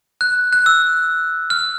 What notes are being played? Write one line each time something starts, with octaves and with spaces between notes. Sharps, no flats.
F#6
F#6
E6
F6